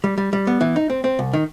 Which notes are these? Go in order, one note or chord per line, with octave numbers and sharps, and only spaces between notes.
G3
G3
G3
B3
E3
D#4
C4
C4
C2
D#3